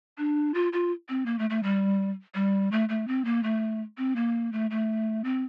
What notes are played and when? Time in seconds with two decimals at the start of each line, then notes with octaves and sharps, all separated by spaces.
0.18 D4
0.54 F4
0.73 F4
1.09 C4
1.26 A#3
1.39 A3
1.50 A3
1.63 G3
2.35 G3
2.72 A3
2.89 A3
3.08 C4
3.25 A#3
3.43 A3
3.98 C4
4.16 A#3
4.53 A3
4.71 A3
5.24 C4